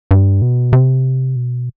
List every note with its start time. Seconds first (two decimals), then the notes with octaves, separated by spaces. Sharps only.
0.11 G2
0.42 B2
0.73 C3
1.36 B2